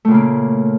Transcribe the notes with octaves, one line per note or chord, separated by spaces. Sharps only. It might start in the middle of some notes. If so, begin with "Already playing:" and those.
A#2 C#3 A3 A#3